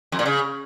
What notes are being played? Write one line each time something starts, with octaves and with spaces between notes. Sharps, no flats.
F2
A#2
C#3